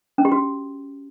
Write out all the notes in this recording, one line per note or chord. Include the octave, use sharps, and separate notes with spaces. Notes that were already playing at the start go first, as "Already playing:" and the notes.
C#4
G4
F#4